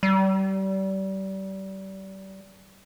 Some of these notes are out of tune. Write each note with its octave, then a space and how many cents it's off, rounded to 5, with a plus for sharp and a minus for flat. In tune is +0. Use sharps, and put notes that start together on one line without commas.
G3 -30